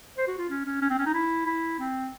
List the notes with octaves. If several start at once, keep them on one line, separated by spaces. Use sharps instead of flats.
C5
F#4
F4
C#4
C#4
C#4
C4
C#4
D#4
E4
E4
C4